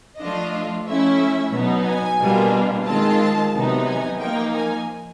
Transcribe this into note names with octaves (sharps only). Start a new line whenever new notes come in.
F3 A3 D4 F4 D#5
F3 A3 C#4 E4 E5
B2 F#3 B3 D#4
G#5
B2 G3 A#3 D4 F4
D#3 G#3 C4 F4 A5
C3 D#3 F#3 B3 D#4
G#5
F3 A#3 D#4 G5
G#5